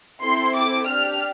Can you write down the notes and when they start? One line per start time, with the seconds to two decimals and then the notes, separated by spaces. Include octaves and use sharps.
0.22 C4 E4 A4 C6
0.55 D6
0.87 D4 G4 F6